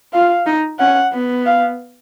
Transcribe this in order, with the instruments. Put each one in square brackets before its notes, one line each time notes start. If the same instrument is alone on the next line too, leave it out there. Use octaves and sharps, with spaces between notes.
[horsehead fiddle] F4 [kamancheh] F5
[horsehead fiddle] D#4
[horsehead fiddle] C#4 [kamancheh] F#5
[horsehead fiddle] B3
[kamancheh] F5